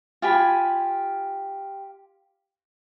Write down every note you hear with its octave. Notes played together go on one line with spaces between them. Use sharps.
F4 G4 G#5 B5